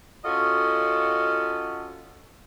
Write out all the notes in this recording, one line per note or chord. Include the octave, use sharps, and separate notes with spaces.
C#4 F4 F#4 A4 D#5